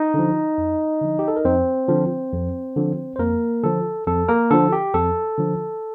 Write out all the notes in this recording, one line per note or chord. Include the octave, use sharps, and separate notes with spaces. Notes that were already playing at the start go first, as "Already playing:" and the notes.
Already playing: D#4 D#5
D3 F3
F2
D3 F3
G4
A4
A#4
F2 C4 C5
D3 F3
F2
D3 F3
C5
F2 A#3 A#4
D3 F3 A4
F2 A4
A#3 A#4
D3 F3 A4
G4
F2 A4
D3 F3